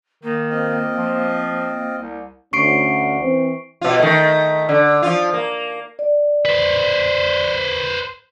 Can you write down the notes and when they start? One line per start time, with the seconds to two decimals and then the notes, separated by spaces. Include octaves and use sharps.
0.23 D#3 A#3
0.50 C4 F4 D#5
0.97 F3
1.98 C2
2.53 D2 C#4 C#6 C7 D7
3.20 E3 C4 C5
3.81 B2 F4
3.99 D#3 A3
4.69 D3
5.03 F3 F4
5.34 A#3
5.99 D5
6.45 B4 C5